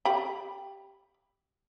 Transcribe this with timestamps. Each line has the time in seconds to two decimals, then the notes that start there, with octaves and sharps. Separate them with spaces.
0.05 G4 B5